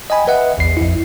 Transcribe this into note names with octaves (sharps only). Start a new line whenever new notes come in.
D#5 G5 G#5 B5
B4 D#5 E5 F#5
A1 E2 C7
F2 E4